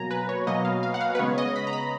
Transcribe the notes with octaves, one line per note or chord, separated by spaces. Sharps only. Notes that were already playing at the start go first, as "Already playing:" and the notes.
Already playing: B2 F#3 A#3 G#5 A#5
B4
C#5
B2 F#3 A#3 D#5
F5
F5
F#5
F5
B4
C#3 G#3 B3 C#5
D#5
B5
A#5
B5